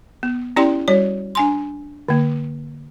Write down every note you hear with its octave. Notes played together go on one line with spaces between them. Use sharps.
B3
C#4 E4 G4 D5 G5 C6
G3 F#4 C#5
D4 G#5 C6
D3 A#3